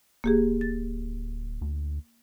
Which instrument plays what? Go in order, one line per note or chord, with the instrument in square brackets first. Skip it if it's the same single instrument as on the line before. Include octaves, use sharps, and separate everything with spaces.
[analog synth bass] D1 [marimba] A#3 G4 G#4
[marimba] A6
[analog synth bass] D2